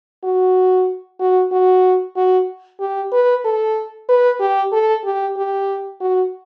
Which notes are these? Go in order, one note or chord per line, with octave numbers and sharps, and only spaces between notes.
F#4
F#4
F#4
F#4
G4
B4
A4
B4
G4
A4
G4
G4
F#4